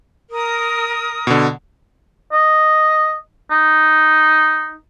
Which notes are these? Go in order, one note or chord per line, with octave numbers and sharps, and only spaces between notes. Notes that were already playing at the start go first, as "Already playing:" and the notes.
A#4 D#6
B2 D3
D#5
D#4